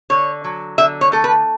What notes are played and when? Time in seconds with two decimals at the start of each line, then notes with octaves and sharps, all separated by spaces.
0.10 D3 C#5
0.44 F#3
0.78 D3 E5
1.01 C#5
1.12 A3 A4
1.24 B4